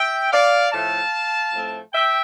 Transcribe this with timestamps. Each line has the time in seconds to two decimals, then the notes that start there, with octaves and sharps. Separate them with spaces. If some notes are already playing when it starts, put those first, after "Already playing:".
Already playing: E5 G5
0.32 D5 F5
0.72 A2 F3 A3 F5 A5
1.53 A2 F3 A3 C4
1.93 E5 G5